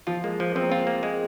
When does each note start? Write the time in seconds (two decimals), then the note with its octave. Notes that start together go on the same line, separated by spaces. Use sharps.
0.07 F3 F4
0.24 G#3 A#3
0.40 F3
0.55 F3 C4
0.62 A#3
0.70 C4 F4
0.87 A#3
1.03 G#3